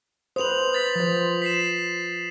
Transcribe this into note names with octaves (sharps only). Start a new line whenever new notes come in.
B4 C5 D#6 F7 F#7
D#6 A6 B6
F3 C5
B6 C7 E7